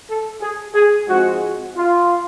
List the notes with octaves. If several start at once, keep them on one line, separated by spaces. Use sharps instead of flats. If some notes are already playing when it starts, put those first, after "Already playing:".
A4
G#4
G#4
G#2 F3 G#3 C4 F#4
F4